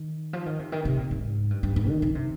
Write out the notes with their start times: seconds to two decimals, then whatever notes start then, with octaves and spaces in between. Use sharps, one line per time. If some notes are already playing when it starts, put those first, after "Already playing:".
Already playing: D#3
0.33 F3
0.46 D#3
0.59 C3
0.72 D#3
0.85 C3
0.98 A#2
1.11 G#2
1.50 G2
1.63 G2
1.76 G#2
1.89 D#3
2.02 D#3
2.15 C3